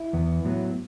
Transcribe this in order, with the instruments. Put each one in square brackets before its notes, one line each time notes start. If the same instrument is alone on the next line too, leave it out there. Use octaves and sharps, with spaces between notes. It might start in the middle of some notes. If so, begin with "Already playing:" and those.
Already playing: [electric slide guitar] E4
E2 E3 B3
A2 F#3 B3